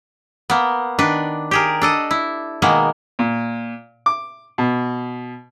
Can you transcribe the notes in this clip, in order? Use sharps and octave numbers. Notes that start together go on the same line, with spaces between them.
A#3 B3
D#3 D4 B4
G4 G#4 A#4
D4 A4 D#5
E4
B2 D#3 G#3 A#3 B3
A#2
D6
B2